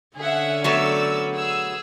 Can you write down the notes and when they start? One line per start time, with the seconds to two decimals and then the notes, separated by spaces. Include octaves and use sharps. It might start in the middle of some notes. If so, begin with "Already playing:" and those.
0.17 D3 C#4 G#4 E5 F#5
0.64 F#3 A3 B3 D5 E6
1.36 G#4 E6